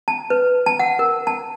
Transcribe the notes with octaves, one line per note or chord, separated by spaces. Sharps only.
A5
B4
A5
F#5
A#4
A5